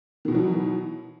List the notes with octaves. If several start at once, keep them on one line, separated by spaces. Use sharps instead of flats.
B2 D#3 E3 F#3